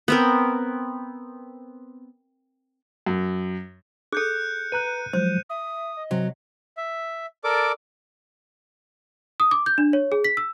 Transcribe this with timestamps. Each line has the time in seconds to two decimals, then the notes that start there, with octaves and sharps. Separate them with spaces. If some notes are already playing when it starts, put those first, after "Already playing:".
0.08 B3 C4 A#4
3.06 F#2
4.13 G#4 A4 F#6 G6 C#7
4.72 B4 A#5 F#6 D#7
5.13 F3 F#3 G#3 C5 G6
5.50 E5 D#6
5.97 D#5
6.11 C3 F#3
6.77 E5
7.44 A4 A#4 D5 D6
9.40 D#6
9.51 D6
9.66 G6
9.78 D4
9.93 C#5
10.12 G#4
10.24 B6
10.37 E6